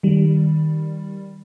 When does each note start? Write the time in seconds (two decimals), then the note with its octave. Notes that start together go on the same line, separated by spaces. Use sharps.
0.03 D#3 G3